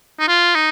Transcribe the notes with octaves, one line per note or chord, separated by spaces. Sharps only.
D#4
F4
D#4